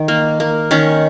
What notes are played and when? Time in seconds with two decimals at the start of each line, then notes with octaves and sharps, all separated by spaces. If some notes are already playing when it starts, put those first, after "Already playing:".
Already playing: D#3
0.08 A#3
0.40 A#3
0.71 D#3 C#4